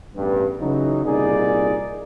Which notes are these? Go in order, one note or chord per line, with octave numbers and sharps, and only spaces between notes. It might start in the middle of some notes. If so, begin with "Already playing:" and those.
A1 E2 G2
C#3 E3 F#3 D#4
C2 A#2 D#4 G#4 D5